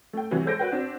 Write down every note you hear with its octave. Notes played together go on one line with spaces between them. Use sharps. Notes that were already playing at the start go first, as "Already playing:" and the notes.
A3 G5
C3 E3 F#3 G3
G#3 A4 C5 G6 A#6 D7
F#4 B4 G5
C4 D4 F#4